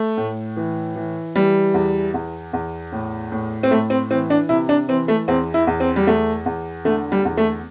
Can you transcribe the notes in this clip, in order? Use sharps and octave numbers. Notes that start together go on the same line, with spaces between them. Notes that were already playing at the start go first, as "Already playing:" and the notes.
Already playing: A3
A2
E3
E3
E3 G3
E2
E2
E2
A2
A2
C4
A2 A3
C4
E3 C4
D4
C3 E4
D4
E3 C4
A3
E2 C4
E4
E2
C4
G3
E2 A3
E2
D3 A3
G3
E2
A3